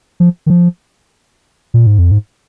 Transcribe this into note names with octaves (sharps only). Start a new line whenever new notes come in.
F3
D#3
F3
A#2
G#2
F2
G#2